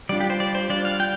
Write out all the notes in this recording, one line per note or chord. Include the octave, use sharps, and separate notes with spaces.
G3 D4 F4 D5
G4
C5
D5
C5
G3 D4 F4 D5
F5
G5